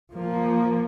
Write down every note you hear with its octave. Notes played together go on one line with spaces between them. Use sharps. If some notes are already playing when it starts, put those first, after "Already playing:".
F3 A#3